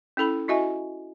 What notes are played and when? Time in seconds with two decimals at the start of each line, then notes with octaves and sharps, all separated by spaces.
0.17 C#4 E4 A4 B5
0.48 E4 F#4 D#5 E5 G#5